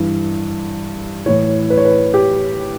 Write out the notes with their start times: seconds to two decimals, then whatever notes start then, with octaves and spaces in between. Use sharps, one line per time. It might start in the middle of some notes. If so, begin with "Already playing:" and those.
Already playing: G2 E3
1.26 A2 E3 C#5
1.70 B4
1.77 C#5
1.85 B4
2.14 G4